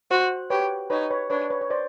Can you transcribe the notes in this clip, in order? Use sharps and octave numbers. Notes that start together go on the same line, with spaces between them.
F#4 C5
G4 B4 C#5
D#4 B4 C#5
B4 C#5
D4 B4 C#5
B4 C#5
C#5
C5 D5